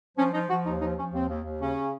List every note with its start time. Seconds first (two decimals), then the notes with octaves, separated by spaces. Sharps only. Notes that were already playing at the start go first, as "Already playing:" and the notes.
0.18 F3 C#4
0.33 F3 D#4
0.49 F3 F#4
0.65 D#2 D#4
0.80 F3 D#4
0.97 F3 C#4
1.12 D#2 C4
1.28 D#2
1.44 D#2
1.60 C#3 C#4